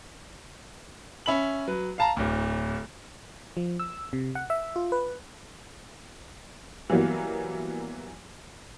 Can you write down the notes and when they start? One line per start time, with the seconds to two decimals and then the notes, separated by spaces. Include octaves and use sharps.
1.26 C#4 E5 B5 F#7
1.68 F#3 B4
1.98 F5 A5 A#5
2.17 D1 D2
3.57 F3
3.80 E6
4.13 C3
4.35 F#5
4.50 E5
4.76 F4
4.92 B4
6.90 E3 F#3 G3 A#3 B3